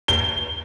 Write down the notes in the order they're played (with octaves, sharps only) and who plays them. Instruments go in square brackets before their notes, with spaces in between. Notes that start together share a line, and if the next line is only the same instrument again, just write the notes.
[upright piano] G7